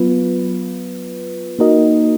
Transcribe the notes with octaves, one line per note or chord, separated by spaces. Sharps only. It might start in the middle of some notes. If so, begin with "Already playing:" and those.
Already playing: F#3 B3 F4 B4
A#3 D#4 F#4 A#4 D#5